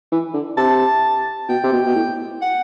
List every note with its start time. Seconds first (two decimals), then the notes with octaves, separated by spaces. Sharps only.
0.12 E3
0.34 D3
0.57 C3 A5
1.49 B2 G5
1.63 C3
1.72 B2
1.86 B2
1.95 A2
2.42 F#5